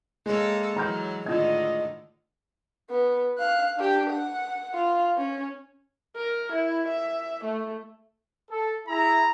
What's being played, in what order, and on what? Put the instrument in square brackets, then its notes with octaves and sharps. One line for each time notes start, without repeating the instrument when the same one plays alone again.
[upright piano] G#3 [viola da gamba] A#3 A4 C#5
[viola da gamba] E3 F#3 [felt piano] A#5 F6 G6
[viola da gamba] A2 D3 D#3 [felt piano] F4 G#6 [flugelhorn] D#5
[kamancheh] B3
F5 F#6
D4 G4
F#5
F4
C#4
[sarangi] A#4
E4
E5
A3
[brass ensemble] A4
[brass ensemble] E4 G#4 E5 [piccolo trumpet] A#5